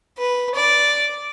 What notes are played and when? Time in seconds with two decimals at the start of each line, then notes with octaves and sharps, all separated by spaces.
0.18 B4
0.55 D5